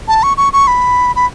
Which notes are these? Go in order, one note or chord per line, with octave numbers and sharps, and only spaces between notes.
A5
C#6
C#6
C#6
B5
B5